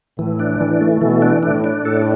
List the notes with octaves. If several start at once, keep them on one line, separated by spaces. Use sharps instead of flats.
A2 E3
D4
E3
A3
B2 E3
D4
A2 D4
D4
A2 A4